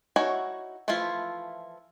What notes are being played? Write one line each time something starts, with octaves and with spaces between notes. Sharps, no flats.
D#4 E4 F#4 C#5 G#5
E3 F3 A3 E4 F4